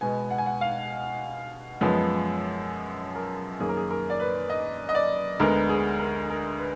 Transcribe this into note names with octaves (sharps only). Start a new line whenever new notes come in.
B2 G#3 B3 G#5
F#5
G#5
F#5
F5
F#2 F3 G#3 B3
A#4
F#2 D#3 A#3 G#4
A#4
G#4
A#4
D5
B4
D#5
D#5
D5
D2 D3 G#3 B3 A#4
G#4
A#4
A#4
B4